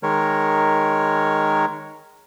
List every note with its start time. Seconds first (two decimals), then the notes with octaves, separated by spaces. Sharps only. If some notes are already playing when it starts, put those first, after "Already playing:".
0.03 D#3 G#3 A#4 C#5